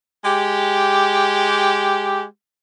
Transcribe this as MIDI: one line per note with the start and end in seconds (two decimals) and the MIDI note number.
0.24 2.24 56
0.24 2.24 67